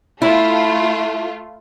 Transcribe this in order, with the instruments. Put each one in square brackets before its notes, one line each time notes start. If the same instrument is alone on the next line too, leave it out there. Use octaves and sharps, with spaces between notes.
[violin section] A3 F4 [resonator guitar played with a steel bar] E4